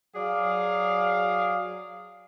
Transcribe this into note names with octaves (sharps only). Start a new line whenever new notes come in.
F#3 G#4 D5 F5